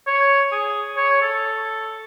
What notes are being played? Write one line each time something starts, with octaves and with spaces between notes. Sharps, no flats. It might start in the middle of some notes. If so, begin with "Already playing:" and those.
C#5
G#4
C#5
A4